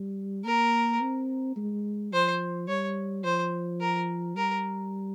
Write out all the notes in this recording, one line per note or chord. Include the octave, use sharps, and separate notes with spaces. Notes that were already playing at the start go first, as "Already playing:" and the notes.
Already playing: G3
A#3 A#4
C4
G#3
F3 C5
G3 C#5
F3 C5
A#4
G3 A#4